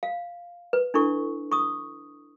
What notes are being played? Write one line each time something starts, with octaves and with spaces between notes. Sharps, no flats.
F5
B4
D4 E4 A4 C#6
C#6 D#6